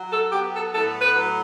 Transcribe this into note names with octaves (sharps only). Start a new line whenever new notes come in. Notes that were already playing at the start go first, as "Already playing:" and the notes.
Already playing: F#3
A4
B3 G4
A4
A2 A4
B4
F#3